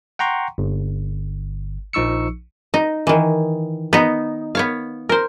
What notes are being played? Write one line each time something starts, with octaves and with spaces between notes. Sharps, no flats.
F#5 G5 A#5 C6 C#6
G1
A#1 F3 D#4 C#6 E6 C#7
D#4
D#3 E3
B3 D#4
B3 C#5 F5
A#4 C5